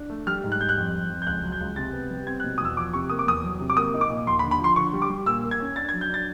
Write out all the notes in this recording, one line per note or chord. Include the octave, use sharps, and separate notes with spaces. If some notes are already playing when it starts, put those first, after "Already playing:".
Already playing: D4
A3
G3 F6
G#2
F#6
G3 G6
F#6
F2
F2
F2
G6
C#2 F#6
F#3
G6
C#2
C3 A6
B3
G3
C4 G#6
F#6
B2
D#6
E2 E6
F3 D6
C3 C#6
A#3 D#6
D6
E2 D#6
F#3
C3
D6
A#3 D#6
D#4
D6
A#2
D#2 C6
B5
D3
B5
F3 C6
D3 C#6
G3
D6
G3
A#2 E6
A#3
G#6
C#4
D4 A6
G#6
F#3
G6
D4 A6